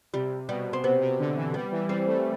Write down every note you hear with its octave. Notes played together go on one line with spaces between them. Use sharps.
C3 G3
B2 G3
C4
C3 B3
C3
D3
E3
G3 B3
E3
G3 C4
A3